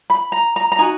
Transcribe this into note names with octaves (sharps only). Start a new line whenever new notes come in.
B5
A#5
A#5
A#5
D#4 F#4 G#5